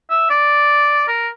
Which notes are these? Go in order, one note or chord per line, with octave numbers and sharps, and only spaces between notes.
E5
D5
A#4